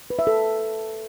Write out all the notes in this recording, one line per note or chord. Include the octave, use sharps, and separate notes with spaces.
B4
E5
A4